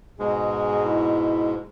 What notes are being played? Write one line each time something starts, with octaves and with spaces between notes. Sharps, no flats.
G#2 B2 G#3 G#4
E4